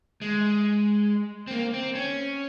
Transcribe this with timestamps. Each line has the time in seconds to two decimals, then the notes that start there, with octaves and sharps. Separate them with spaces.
0.22 G#3
1.48 C4
1.51 A#3
1.74 C4
1.95 C#4